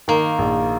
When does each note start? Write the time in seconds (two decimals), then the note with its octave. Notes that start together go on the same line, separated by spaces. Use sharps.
0.08 D#3 A#3
0.38 A#1